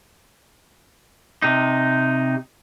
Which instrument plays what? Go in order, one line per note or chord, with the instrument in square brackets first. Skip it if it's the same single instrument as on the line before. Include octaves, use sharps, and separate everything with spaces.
[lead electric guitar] C3 D#4